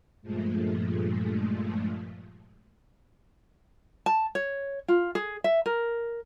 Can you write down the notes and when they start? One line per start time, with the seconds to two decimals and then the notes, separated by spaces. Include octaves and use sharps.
0.22 G2 A#2 F3 G#3 A3
4.06 A5
4.35 C#5
4.88 F4
5.15 G#4
5.44 E5
5.66 A#4